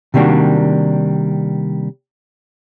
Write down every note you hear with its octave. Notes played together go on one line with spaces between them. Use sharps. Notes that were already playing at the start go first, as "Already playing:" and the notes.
C3 D#3 G3 A#3 D4 F#4